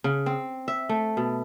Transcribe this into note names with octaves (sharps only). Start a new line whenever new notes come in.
C#3
C4
E5
A3
B2